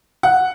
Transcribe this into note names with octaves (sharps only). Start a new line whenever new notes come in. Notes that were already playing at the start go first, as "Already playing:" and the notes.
F#5